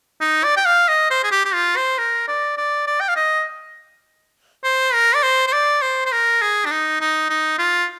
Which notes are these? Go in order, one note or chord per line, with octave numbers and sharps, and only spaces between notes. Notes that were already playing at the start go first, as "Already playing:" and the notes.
D#4
D5
G5
F5
D#5
C5
G#4
G4
G4
F4
C5
A#4
D5
D5
D5
G5
F5
D#5
C5
A#4
D5
C5
C5
D5
C5
C5
A#4
G#4
D4
D#4
D#4
D#4
F4